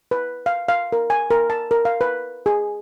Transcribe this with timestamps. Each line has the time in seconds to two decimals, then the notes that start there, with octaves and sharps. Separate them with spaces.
0.11 B4
0.46 F5
0.68 F5
0.92 A#4
1.10 G#5
1.30 A#4
1.50 A5
1.71 A#4
1.85 F5
2.01 B4
2.46 G#4